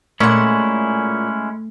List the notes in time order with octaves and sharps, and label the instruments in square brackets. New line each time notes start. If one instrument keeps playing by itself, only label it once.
[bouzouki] A#2 F#5 [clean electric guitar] G#3 C#4 E4 [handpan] A3